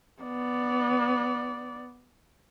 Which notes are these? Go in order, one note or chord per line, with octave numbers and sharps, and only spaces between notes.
B3 D5